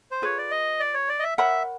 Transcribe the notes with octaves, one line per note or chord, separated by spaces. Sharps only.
C5
F4 G#4 B4 C#5
D5
D#5
D5
C#5
D5
D#5
E5
A#4 C#5 E5 F#5 B5